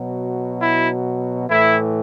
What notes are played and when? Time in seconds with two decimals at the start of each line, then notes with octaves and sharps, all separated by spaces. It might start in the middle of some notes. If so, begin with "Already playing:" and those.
Already playing: B2 F#3
0.61 E4
1.49 A2 E3 E4